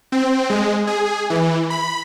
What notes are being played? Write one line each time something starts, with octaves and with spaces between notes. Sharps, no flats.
C4
G#3
G#4
E3
B5